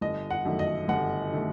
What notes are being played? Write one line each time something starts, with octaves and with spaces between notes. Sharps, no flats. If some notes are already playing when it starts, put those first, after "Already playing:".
G1 D#5
F#5
F#2 D#3 A3
D#5
G1 F#5
D#3 A3